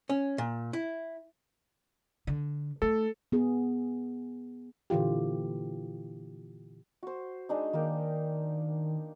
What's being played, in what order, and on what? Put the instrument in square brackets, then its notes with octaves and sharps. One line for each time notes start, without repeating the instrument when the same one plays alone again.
[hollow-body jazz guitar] C#4
A#2
E4
[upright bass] D3
[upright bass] A3 D#4 [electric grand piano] A4
[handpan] B3 G#4
A#2 D3 E3 F4 G4
[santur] F#4 C5
G#3 D4 D#4
[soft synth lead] D#3 [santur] A#3 A#4 G5